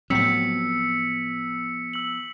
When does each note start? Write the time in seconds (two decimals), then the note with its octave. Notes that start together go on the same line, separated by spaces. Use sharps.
0.10 A2 F3 F#3 B3 C4 E6 B6 C#7
1.93 E6 F#7